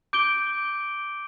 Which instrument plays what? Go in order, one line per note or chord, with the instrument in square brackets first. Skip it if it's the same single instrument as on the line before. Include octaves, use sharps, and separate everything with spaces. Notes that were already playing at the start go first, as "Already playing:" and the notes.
[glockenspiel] D6 G6 D7 G7